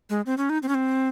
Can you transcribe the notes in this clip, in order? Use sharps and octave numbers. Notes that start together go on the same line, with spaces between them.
G#3
C4
C#4
D#4
C4
C#4
C4